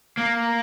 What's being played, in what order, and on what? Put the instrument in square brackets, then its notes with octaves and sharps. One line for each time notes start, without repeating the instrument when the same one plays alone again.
[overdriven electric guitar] A#3